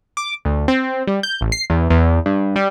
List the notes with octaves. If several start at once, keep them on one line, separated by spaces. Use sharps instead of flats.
D6
D2
C4
G3
G6
A1
C7
E2
E2
G2
G3